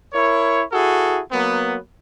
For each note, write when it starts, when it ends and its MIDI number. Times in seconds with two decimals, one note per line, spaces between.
0.13 0.62 64
0.13 0.62 70
0.13 0.62 73
0.72 1.20 64
0.72 1.20 66
0.72 1.20 68
0.72 1.20 69
1.31 1.76 54
1.31 1.76 58
1.31 1.76 59